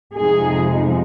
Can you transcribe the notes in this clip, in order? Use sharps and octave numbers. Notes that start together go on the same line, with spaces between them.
F2 C3 F3 G#3 D#4 G#4